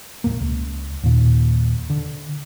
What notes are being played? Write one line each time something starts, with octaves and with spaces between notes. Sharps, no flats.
A#1 F2 A#3
C#2
D#2 A#2
D3